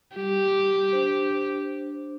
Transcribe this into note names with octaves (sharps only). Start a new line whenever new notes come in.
G3 G4
D4 C5